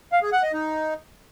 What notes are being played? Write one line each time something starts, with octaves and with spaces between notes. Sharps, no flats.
F5
G#4
F#5
D#5
D#4